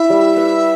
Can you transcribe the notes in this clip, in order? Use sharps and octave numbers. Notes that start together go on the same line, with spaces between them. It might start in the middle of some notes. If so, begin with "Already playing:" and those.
Already playing: E4 E5
G3
B4